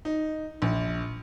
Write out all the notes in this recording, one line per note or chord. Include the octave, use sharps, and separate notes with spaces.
D#4
A#1